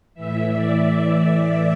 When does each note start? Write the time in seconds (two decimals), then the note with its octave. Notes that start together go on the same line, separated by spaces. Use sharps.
0.14 A2 E3 E5
0.52 D5